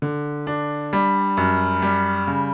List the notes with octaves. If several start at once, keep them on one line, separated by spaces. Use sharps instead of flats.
D3
D4
G3
F#2
G3
C#3